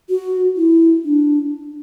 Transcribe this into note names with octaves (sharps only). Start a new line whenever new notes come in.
F#4
E4
D4